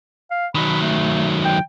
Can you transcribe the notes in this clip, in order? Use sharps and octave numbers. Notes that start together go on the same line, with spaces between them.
F5
D#3 F#3 B5
A3
G5